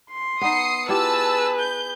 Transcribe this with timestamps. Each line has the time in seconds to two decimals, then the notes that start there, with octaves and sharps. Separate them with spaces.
0.12 C6
0.41 B3 D#4 D#6 C7 C#7
0.89 E4 F4 G4 G#4 B4 A5 E6
1.57 G6